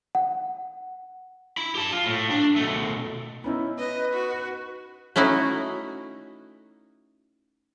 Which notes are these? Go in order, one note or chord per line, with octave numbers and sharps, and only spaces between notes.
F#5
E4 B5
G4 A5
F4
A2
D4
B2 A3
B3 C#4 D#4 E4
B4 D#5
F#4
A3 C#4 D#4 E4 F#4